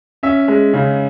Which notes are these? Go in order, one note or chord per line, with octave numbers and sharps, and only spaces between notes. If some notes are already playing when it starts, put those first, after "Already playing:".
C#4 E5
G#3
C#3